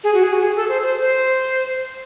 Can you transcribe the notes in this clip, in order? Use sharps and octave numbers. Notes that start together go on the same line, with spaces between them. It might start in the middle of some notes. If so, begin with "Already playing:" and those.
G#4
F#4
G#4
F#4
G#4
A4
C5
C5
C5